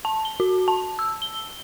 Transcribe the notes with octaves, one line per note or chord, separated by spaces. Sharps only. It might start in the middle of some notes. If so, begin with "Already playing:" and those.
A5
G7
F#4
A5
E6
G7